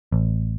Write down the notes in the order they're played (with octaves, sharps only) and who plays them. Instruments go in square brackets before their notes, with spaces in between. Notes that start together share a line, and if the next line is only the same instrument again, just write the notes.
[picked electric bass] A1